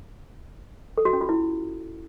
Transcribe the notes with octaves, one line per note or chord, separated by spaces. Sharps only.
A4
F#4
C#4
F4
E4